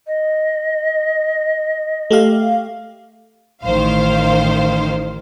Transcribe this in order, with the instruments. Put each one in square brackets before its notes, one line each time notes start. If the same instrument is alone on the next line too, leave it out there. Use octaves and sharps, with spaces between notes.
[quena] D#5
[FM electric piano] A3 G4 F5
[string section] A1 D#3 C5 F5